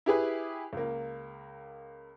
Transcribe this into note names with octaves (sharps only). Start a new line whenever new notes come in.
E4 G4 G#4 B4
C#2 A#3